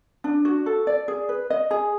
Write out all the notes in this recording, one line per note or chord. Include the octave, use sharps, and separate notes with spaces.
D4
F#4
A4
D5
G#4
B4
D#5
G#4